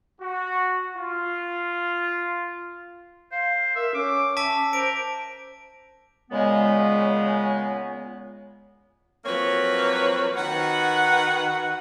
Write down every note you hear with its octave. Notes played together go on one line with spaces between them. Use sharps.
F#4
F4
C5 F5
A#4 E5
C#4 D6
E5 A5 D6 B6
A#4 C5 D7
A#2 C#3 G#3 B3
F3 F#3 A#3 C4 B4 C#5
D#3 F#4 B4 F#5